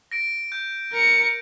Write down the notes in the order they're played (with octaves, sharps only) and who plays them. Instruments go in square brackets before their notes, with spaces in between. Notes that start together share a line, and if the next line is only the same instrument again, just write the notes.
[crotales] A#6 D7
G6
[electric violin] A#4 C#7